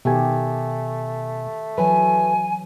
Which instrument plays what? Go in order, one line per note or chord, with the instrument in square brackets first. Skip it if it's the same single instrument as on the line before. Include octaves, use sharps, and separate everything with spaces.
[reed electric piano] B2 G#5 [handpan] D#3 G4 [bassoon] A3
[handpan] E3 F#3 [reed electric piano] B4 [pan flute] G#5